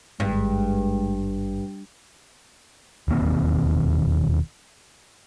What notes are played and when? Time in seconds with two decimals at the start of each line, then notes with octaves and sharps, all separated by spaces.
0.20 G#1 G2 G#3
3.08 E1 D#2 A#3 C4